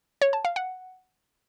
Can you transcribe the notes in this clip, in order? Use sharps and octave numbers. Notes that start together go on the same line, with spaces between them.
C#5
A5
F5
F#5